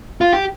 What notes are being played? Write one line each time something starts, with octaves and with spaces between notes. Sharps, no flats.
F4
G4